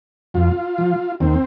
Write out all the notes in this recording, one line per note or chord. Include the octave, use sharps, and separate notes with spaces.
F2 F4
F3
D#2 C4